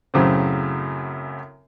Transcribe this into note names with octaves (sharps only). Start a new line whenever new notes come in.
F#2 A2 C#3 F#3 C4